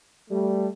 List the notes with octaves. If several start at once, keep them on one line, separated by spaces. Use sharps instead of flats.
G3 A3